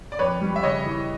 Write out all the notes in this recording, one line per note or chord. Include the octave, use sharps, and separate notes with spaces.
D5
F2 B4 C#5
G3
E5
C#3 C#5 D#5
E3